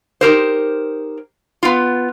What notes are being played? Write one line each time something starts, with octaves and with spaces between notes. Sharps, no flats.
D#4 G4 A#4 C5
B3 F4